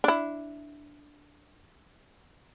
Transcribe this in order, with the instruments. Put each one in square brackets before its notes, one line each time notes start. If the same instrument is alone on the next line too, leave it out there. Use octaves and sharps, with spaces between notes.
[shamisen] D4 E4